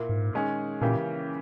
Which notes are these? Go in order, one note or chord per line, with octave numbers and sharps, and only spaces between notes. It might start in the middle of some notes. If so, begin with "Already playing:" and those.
Already playing: A#2 A#3 E4 A#4
G#2
D#3 G#3 C#4 G#4
A#2 C#3 E3 A#3 C#4 G4